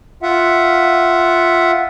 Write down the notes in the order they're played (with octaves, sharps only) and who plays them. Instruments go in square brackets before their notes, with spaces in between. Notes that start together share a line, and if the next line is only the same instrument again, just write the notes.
[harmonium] F4 E5 F#5